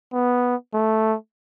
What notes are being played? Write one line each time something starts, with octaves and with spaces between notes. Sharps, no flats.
B3
A3